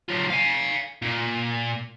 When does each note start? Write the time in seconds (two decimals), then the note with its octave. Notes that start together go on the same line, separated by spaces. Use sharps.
0.09 F#3 F4
0.30 F5 G#5
1.02 A#2